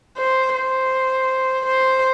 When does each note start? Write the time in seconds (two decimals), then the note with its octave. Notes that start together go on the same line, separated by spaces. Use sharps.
0.17 C5
0.54 C5
1.66 C5